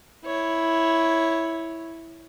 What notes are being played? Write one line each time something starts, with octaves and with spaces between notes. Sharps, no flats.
E4 C#5